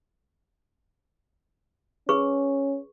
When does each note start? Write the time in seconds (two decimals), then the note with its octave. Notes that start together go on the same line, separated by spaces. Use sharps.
2.09 C#4 G#4 B4 C#6